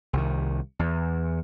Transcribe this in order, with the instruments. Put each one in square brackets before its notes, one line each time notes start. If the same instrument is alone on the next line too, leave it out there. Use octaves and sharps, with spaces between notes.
[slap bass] C2 D#3
E2